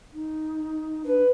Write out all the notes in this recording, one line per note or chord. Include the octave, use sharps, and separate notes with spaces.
D#4
D4 B4